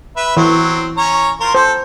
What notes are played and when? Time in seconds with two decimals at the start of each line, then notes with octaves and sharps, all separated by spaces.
0.16 B4 E5
0.37 E3 F#3 C4
0.97 C#4 C#5 A#5
1.40 F4 A#4 C5
1.55 A4 C5